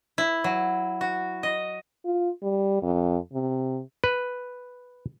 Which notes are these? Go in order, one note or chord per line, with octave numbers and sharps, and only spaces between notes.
E4
F#3
F#4
D#5
F4
G3
F2
C3
B4